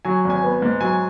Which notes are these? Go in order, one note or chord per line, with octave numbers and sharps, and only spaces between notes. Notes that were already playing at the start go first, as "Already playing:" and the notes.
F#3 G#5
G#1
G#5
B3
G#2
F#3 G#5